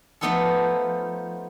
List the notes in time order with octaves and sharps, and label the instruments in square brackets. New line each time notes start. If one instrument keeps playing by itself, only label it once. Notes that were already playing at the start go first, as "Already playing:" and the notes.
[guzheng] F3 A3 B3 D#4 F4 A4